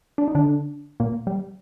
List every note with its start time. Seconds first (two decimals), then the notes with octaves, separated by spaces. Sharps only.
0.18 D4
0.28 D#4
0.35 D3 D4
1.00 A#2 A#3
1.27 G3